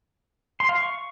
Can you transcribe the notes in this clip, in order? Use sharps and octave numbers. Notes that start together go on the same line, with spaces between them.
C6
F5
C#6